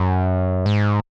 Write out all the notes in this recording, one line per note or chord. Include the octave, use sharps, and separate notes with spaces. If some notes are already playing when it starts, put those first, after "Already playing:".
Already playing: F#2
G#2